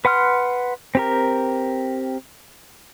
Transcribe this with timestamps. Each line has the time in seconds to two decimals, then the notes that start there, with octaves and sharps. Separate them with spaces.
0.05 B4 F#5 C6 F6
0.95 C4 G4 A#4